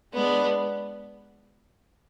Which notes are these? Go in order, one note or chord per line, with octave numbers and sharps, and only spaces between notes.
G#3 B3 D4